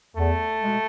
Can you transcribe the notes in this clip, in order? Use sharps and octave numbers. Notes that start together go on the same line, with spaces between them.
E2 A3
B2 G#3